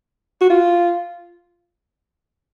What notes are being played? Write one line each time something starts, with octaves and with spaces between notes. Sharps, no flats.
F#4
F4